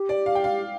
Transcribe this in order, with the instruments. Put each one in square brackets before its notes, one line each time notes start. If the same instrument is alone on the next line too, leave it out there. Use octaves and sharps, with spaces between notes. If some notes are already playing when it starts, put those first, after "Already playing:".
Already playing: [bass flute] G4
[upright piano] D5
F5
G5
F5